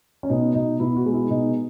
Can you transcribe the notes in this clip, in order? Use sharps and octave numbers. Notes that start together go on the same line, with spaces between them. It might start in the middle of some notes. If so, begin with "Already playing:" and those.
C#4
B2 D#4
B2 D#4
B2 E4
F#4
G#3
E4
B2 D#4